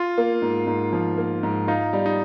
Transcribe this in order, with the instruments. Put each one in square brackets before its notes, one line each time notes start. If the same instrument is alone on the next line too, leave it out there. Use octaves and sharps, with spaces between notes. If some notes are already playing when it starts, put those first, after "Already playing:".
Already playing: [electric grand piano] F4
[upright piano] A#3
G#2
G#2
F3
A#3
G#2
[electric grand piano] D#4 [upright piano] F4
[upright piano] G3
[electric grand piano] D#4